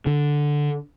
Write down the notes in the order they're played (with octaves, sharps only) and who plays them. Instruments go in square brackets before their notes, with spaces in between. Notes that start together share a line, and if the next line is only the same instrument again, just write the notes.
[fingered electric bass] D3